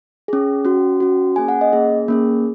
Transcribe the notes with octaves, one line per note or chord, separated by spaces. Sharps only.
C#4 G#4
C#4 F#4
C#4 F#4
A#3 C#4 G#4 G#5
F#5
D#5
A#3 C#4 G#4
A#3 C#4 G#4